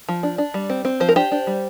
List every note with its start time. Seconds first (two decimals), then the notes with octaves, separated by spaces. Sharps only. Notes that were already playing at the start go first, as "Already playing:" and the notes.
0.09 F3
0.23 D4
0.38 D4
0.54 G3
0.70 C4
0.85 C4
1.00 F3 C5
1.09 A#4
1.16 D4 G4 C5
1.32 D4
1.47 G3